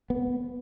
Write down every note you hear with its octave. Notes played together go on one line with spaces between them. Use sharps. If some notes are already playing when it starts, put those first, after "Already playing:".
B3